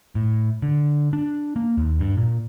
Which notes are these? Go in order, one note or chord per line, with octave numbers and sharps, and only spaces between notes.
A2
D3
D4
A#3
D#2
G2
A#2